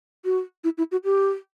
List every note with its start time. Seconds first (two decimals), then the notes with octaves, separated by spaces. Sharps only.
0.25 F#4
0.64 E4
0.78 E4
0.92 F#4
1.04 G4